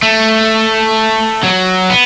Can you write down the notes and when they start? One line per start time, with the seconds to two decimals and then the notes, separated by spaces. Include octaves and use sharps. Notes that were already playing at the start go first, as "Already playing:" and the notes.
0.03 A3
1.43 F#3
1.90 B3